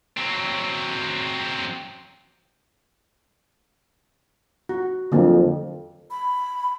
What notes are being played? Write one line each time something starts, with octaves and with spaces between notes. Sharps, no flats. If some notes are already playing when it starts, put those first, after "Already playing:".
F#3 C4
F#4
F2 D3 F#3 A#3
B5